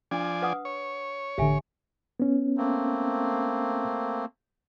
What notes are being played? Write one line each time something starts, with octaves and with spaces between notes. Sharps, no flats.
F3 D4 D5 G#5
B4 F#5 D#6
C#5
A1 D3 G4 E5 G#5
B3 C#4
A3 A#3 C4